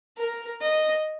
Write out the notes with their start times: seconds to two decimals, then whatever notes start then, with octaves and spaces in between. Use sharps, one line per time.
0.17 A#4
0.61 D#5